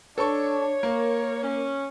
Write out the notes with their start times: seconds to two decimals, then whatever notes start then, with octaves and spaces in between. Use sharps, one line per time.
0.18 D4 A4 C#5 C#6
0.83 A#3 A#4
1.43 C#4